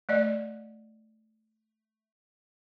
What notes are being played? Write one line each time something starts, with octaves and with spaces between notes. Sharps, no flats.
A3 D5 D#5